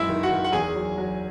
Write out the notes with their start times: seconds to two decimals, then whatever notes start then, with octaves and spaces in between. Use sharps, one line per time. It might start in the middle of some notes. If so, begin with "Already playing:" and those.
Already playing: F#2 G#3 E4 E5
0.09 D#3
0.23 F#4 F#5
0.31 D#3
0.44 F#5
0.53 E2 G#4 G#5
0.75 F#3
0.98 F#3